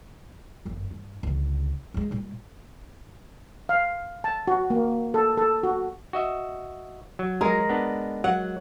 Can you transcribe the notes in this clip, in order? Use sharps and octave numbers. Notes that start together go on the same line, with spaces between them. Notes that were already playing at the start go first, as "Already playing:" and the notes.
G1 F#2
G2
C#2 D3
F#3 G#3
A#2 G3
F5
A5
F#4
A#3
A4
A4
F#4
F#4 D#5 E5
F#3
G#3 A#4
B3 D4
F#3 F#5